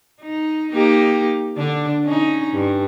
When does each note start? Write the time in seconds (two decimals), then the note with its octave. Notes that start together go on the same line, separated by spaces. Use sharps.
0.22 D#4
0.73 A#3 D#4 G4
1.57 D3 D4
2.05 C#4 D#4
2.54 G2